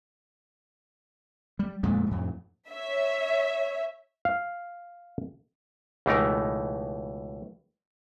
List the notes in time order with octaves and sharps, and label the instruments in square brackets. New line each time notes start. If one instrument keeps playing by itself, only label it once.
[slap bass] G3
F2 A#2 G#3 A3
F2 A2
[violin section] C#5 E5
[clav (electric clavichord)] F5
C#2 B2 E3 A3 D#4 A#4